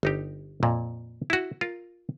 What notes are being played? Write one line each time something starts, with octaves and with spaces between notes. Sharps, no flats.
G1 D#4 G4
F2 A#2
E4 F#4
F4 A#4